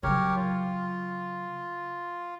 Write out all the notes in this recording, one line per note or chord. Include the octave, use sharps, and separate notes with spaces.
C#3 F#3 G4 A#4 C#5
F4